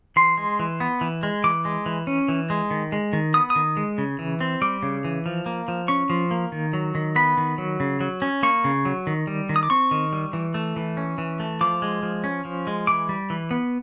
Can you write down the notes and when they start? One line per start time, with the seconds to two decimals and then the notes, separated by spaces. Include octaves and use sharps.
0.16 E3 C6
0.38 G#3
0.59 E3
0.80 B3
1.01 E3
1.23 G#3
1.44 E3 D6
1.65 G#3
1.86 E3
2.07 C#4
2.28 E3
2.50 G#3
2.71 D#3
2.92 G#3
3.13 D#3
3.34 B3 D#6
3.50 D#6
3.56 D#3
3.77 G#3
3.98 C#3
4.19 E3
4.40 C4
4.62 G3 D6
4.83 C#3
5.04 E3
5.26 F3
5.46 A#3
5.68 F3
5.88 C#4 C#6
6.10 F3
6.31 A#3
6.52 D#3
6.73 F#3
6.95 D#3
7.16 B3 B5
7.37 D#3
7.58 F#3
7.80 C#3
8.00 F#3
8.22 C#4
8.43 A#3 C#6
8.64 C#3
8.85 F#3
9.07 D#3
9.27 G3
9.49 D#3
9.56 D#6
9.63 D6
9.70 C4 C#6
9.91 D#3
10.13 G3
10.33 E3
10.54 A3
10.76 E3
10.97 C#4
11.18 E3
11.40 A3
11.61 F3 D6
11.82 G#3
12.03 F3
12.24 C#4
12.45 F3
12.67 G#3
12.87 E3 D6
13.09 G3
13.30 E3
13.51 B3